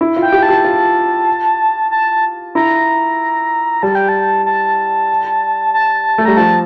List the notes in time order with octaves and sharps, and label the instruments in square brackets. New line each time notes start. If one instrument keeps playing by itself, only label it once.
[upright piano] E4
F4
[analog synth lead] G5
[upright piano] G4
[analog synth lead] A5
[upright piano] G4
F4
[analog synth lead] A5
[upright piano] E4 [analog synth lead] A#5
[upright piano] G3 [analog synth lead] A5
[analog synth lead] G5
A5
A5
A5
[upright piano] A3
[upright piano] G3 [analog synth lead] A#5
[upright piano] F3 [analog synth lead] A5